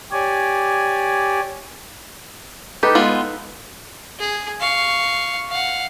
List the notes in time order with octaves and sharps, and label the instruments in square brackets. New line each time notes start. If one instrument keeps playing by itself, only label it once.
[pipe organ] G4 C#5 D5 G#5
[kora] D#4 A4 B4 [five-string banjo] G4
[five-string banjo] G#3 B3 F4
[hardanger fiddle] G#4
F5 C#6
F5 F#5